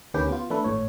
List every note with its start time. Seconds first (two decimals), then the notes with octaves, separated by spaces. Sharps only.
0.14 D2 D#3 C#4 G4 B4 G5
0.28 B3 F4
0.50 E3 A3 D4 A4 B4
0.64 G#1 A2 C#5